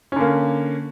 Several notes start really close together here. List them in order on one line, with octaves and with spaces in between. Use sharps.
C#4 D3 A#3